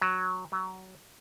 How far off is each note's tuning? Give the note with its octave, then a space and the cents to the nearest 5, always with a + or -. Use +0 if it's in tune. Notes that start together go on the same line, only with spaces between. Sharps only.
F#3 -5
F#3 +20